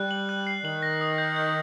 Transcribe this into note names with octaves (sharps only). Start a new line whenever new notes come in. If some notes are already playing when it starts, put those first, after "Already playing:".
Already playing: G3 F#6
F#7
F#6
C7
D#3 F#7
A#6
D#6
G6
G6